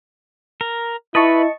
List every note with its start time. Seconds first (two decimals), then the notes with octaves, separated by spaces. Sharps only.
0.61 A#4
1.15 E4 B4 D#5 A5 C#6